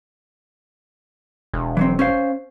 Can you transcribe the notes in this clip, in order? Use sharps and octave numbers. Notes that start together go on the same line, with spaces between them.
E1
E3 F#3 C4
C#4 C5 F5